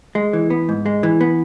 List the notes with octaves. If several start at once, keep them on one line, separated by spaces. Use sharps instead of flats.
G#3
E3
B3
G#2
G#3
E3
B3